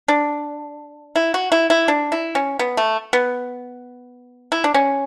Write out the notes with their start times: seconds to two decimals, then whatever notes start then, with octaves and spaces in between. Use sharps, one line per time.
0.08 D4
1.16 E4
1.34 F#4
1.52 E4
1.70 E4
1.88 D4
2.12 E4
2.35 C#4
2.59 B3
2.77 A3
3.13 B3
4.52 E4
4.64 D4
4.74 C#4